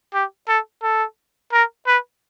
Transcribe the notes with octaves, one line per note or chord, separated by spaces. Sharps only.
G4
A4
A4
A#4
B4